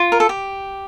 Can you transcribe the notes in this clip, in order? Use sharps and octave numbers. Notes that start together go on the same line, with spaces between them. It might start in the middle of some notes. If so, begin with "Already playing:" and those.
Already playing: F4
A#4
A4
G4